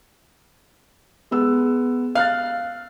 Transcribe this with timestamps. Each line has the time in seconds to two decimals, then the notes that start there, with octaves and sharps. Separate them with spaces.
1.31 G#3 B3 E6
2.15 F5 F6 F#6 A6